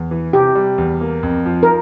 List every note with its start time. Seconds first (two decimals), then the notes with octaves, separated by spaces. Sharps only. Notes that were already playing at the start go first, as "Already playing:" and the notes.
Already playing: E2
0.11 E3
0.33 C3 G4
0.55 G3
0.78 E2
1.01 A#3
1.23 F2
1.46 F3
1.63 A#4